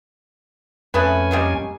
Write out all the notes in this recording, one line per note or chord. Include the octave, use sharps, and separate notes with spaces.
F2 A3 C#4 G#4 B4 G#5
G3 G#3 A#3